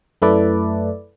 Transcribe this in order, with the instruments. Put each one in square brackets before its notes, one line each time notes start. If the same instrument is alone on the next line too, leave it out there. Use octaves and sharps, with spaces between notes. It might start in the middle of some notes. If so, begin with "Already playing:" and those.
[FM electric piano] F#2 A3 E4 A4 B4 D5